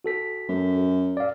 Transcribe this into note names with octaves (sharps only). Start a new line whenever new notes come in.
F#4 A4 B6
F#2
D5 F5